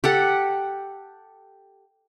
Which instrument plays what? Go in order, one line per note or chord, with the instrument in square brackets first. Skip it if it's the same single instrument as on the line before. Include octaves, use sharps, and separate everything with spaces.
[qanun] G4 A4 F#5